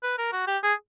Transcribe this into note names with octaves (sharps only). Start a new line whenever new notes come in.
B4
A#4
F#4
G4
G#4